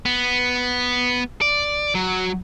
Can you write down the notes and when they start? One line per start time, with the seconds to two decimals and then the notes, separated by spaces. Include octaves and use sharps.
0.05 B3
1.42 D5
1.95 F#3